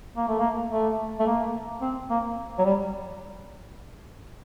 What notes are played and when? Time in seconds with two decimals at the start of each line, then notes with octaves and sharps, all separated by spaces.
0.17 A#3
0.28 A3
0.39 A#3
0.71 A3
1.19 A3
1.27 A#3
1.81 C4
2.10 A#3
2.59 F#3
2.64 G3